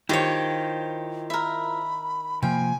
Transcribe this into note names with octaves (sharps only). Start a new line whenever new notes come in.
D#3 E4 F4 G4 C5 C#5
A#4 E5 B5
C3 F3 A#3 G5 G#5